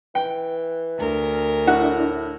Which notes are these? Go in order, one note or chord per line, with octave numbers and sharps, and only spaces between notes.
E3 G5
D2 A#4
A2 D4 E4 F#4